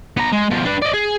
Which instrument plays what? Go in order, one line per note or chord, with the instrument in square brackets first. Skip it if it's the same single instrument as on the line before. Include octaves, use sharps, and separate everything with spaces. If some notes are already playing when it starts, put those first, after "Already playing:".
[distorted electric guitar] B3 A#5
G#3
B2 F3
D4 B4
D5 D#5
G#4